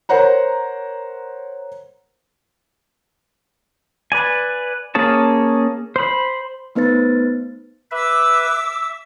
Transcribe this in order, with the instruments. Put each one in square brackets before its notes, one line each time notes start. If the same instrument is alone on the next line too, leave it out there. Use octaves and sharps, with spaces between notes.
[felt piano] A#4 C5 C#5 F#5 A#5
[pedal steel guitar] B4 D5 G#5
A#3 C#4 G#4 C#5 A5
C5 B5
[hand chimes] A3 B3 D#4 B4 C5 A6
[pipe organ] B4 E5 [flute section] D6 E6
[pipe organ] E5